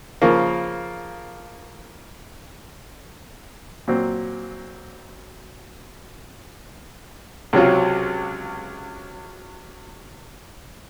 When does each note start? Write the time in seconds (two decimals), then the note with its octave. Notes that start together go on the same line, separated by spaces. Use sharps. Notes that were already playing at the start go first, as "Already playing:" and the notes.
0.22 C#3 F3 A#3
3.88 A#2 F#3 C4
7.53 C#2 C3 F#3 C#4 F4